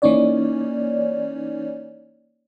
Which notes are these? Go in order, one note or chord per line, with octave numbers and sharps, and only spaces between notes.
E3 A#3 C#4 D#4 C#5 D5